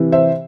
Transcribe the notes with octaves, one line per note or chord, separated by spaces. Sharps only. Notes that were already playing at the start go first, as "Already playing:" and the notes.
Already playing: C3 E3
C5 E5